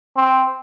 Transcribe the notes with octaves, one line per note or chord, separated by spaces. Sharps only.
C4